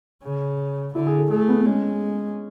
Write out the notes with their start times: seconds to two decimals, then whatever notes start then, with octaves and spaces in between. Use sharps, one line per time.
0.23 C#3
0.94 D3 E4
1.07 G#4
1.19 A4
1.31 A3 G#4
1.48 B3
1.61 B3
1.66 G#3 C#4